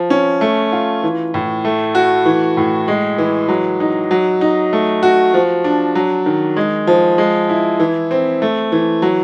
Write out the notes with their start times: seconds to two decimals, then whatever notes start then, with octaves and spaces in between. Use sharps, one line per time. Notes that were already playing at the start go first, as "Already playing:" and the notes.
Already playing: F3
0.10 C#4
0.41 A3
0.72 F4
1.03 E3
1.34 A2
1.65 A3
1.95 F#4
2.26 E3
2.57 A2
2.88 G#3
3.18 E3
3.49 F#3
3.80 D#4
4.11 F#3
4.41 D#4
4.73 A3
5.03 F#4
5.34 F3
5.64 D4
5.95 F#3
6.26 D#3
6.57 G#3
6.87 F3
7.18 G#3
7.49 E4
7.80 E3
8.11 C4
8.42 A3
8.72 E3
9.02 F#3